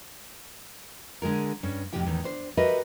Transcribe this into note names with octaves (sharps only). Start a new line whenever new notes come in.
D3 G#3 G#4 A#4
G2 C#4
F2 A2 C3 G4 G5
E2 A2 D#3
D4 C5
F#4 G4 A#4 B4 D#5 E5